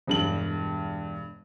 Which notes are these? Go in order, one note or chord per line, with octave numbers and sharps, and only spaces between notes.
E1 G2 F#7